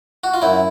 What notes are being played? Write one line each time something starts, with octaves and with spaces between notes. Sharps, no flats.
F#4
F4
F#2 E4